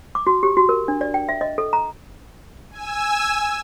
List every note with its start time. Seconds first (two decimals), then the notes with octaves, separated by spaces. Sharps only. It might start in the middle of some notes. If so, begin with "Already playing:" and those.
0.15 D6
0.27 F#4
0.43 G4
0.57 F#4
0.69 A#4
0.88 D4
1.01 D5
1.14 G5
1.29 E5
1.41 D#5
1.58 A4
1.73 A#5
2.71 G#5 E6